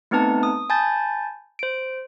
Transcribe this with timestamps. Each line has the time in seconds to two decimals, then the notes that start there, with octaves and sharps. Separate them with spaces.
0.11 A3 B3 C4 D#4 B4 A5
0.43 D#6
0.70 G#5 A5 B5 G6 A6
1.59 C5 D7